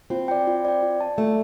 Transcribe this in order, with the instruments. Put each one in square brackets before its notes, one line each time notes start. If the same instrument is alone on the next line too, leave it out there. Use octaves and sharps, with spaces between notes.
[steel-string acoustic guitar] C4 [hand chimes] F4
[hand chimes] D5 G5
F4
D5 G5
F4
D5 A5
[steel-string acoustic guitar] A3 [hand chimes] F4